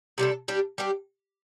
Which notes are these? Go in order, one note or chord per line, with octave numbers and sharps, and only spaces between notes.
C3 G3 D4 A4
G3 D4 G4
G3 D4 G4